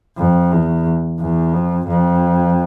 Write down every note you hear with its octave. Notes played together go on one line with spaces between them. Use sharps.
F2
E2
E2
F2
F2